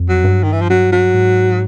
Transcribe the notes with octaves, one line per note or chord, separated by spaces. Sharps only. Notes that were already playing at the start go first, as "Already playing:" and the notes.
Already playing: F2
F#3
G2
D#3
E3
F3
F#3
F#3
G#2